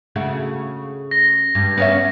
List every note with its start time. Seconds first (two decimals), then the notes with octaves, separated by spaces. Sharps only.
0.16 C#3 A3 F#4
1.11 A#6
1.55 G2
1.77 B3 C#4 E5